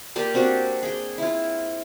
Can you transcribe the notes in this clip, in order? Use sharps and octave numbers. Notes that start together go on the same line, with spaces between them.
A#3 F4 G4 D5
C4 D4 F#4 G4
G#4 G5
E4 F4